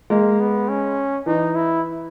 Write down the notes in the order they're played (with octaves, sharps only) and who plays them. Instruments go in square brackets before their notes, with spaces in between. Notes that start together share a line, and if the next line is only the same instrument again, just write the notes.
[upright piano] G#3 [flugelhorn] A#3
[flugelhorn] B3
C#4
[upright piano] E3 [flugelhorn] D#4
[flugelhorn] E4